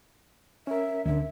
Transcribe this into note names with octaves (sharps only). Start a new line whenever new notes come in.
C#4 A#4 E5
D2 D3 E5